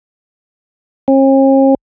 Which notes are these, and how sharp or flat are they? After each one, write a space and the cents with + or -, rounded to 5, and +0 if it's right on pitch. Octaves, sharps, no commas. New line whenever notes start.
C#4 -45